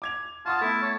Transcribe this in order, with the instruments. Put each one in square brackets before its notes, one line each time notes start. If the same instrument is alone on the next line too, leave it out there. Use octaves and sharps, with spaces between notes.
[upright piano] D6 G#6 F7
[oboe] F4 [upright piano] F#5 C#6 D#6 [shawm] A5
[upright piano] A3 B3 [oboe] E4
[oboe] C#5